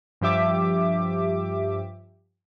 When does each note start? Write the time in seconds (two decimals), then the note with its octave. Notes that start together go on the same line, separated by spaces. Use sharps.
0.21 G2 F3 G4 E5 D6